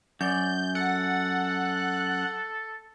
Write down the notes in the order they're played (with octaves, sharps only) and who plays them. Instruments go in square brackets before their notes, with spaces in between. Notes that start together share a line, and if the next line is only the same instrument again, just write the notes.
[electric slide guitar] F#2 [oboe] D5 [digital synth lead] G6
[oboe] A4 [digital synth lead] F#5